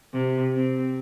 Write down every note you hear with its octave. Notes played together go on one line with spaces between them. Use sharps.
C3
C4